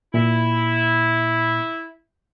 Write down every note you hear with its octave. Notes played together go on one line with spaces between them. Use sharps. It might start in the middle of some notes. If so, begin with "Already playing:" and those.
A#2 E4